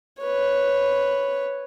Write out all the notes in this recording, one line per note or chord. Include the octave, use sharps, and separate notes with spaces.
B4 C#5